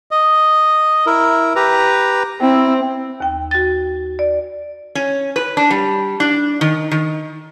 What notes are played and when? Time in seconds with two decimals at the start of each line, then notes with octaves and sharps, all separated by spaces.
0.11 D#5
1.06 E4 A#4
1.56 G4 B4 A#5
2.42 C4 E4
3.20 D#2 G5
3.51 F#4 A6
4.19 D5
4.95 C#4
5.36 B4
5.57 D4
5.70 G3
6.20 D4
6.61 D#3
6.91 D#3